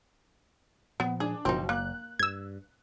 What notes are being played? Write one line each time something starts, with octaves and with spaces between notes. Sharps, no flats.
A#2 F3 B3
D4 G#4
F#1 B2 F3 C4 D#4
A#3 F#6
G2 E6 G#6